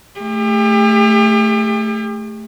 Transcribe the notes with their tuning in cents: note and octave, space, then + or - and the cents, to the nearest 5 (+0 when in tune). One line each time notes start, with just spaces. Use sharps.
A3 +0 G4 +40